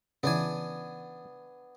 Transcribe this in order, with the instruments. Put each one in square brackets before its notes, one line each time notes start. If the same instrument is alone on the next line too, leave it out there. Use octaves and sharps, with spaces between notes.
[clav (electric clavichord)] C#3 E3 [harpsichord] B3 D4 G#5